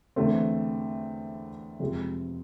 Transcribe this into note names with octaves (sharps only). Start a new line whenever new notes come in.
E2 D3 A3 C4
F2 C3 G#3